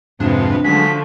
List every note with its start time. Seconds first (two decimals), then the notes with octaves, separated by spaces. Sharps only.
0.20 F2 G#2 C3 D4 B4
0.64 D3 F3 F#3 G#3 A3 B6